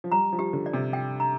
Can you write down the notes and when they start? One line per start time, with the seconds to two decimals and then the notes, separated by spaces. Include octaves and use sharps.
0.04 F3
0.12 G3 A#5
0.33 F3
0.39 G4
0.53 D3
0.66 D5
0.73 C3
0.93 G5
1.20 A#5